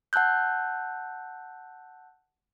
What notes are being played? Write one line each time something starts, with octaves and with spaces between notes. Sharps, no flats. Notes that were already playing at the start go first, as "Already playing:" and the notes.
F#5 A5 E6 F#6 G6